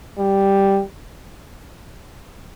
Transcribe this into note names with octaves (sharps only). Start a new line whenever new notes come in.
G3